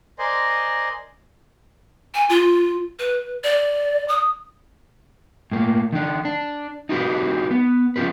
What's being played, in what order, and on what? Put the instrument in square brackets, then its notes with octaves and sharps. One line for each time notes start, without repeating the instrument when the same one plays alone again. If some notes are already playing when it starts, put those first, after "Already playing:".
[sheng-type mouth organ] A#4 C5 D5 D#5 G#5 C6
[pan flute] G#5
F4
B4
D5
D#6
[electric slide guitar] A2 A#3
D#3 D4
D4
D#4 E4 F#4 G4 A4 B4
B3
C#4 F4 G4 B4